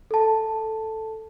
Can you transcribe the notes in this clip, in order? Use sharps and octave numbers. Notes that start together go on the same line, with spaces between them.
A4 A5